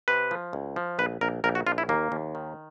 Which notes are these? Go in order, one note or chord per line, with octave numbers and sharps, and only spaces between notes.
C3 B4
F3
C#2
F3
A#1 B4
A#1 A#4
A#1 A#4
F#4
A#1 F4
E4
D#2 A#3
D#2
D#3